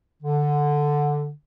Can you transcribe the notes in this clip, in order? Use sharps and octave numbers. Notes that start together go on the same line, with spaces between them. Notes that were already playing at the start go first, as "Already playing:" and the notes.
D3